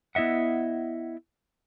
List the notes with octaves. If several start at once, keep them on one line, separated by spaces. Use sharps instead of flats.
B3 E4 D#5 E5 F#5